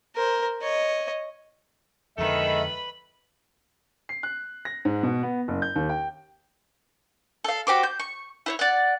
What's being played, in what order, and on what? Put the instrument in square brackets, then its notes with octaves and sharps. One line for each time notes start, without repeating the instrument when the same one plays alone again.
[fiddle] A#4 C5
C#5 D#5
[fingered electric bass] F2 D3 [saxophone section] D#3 A4 [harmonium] G#3 E5 [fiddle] B4 B5
[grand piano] C7
F#6
A#6
G#2
B2
B3
F#1
G6
D#2
G5
[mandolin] A4 F5
F#4 G4 C5 D6
G6
C#6
E4 C5 C#5
D5 F#5